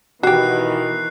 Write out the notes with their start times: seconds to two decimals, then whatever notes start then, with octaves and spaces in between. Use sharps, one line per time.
0.23 B2 D#3 E3 F#4 G4 F#6 C7